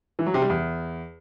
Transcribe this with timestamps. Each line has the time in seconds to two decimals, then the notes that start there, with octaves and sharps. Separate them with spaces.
0.19 E3
0.26 F#3
0.34 C3
0.42 G3
0.50 E2